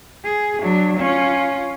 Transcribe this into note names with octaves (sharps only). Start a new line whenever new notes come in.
G#4
F#3 D4
C#4 F4